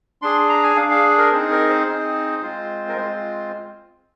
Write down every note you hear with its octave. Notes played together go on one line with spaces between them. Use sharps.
D4 G#4 C6
A#5
G#5
D4 G#4 F5
F5
A#4
C4 D#4 G#4 C5
A#4
C5
C4 D#4 G#4
G#3 C4 F4
A#4
G#3 C4 F4 C5